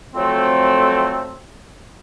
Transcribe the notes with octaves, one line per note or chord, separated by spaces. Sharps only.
F2 F#3 A3 C4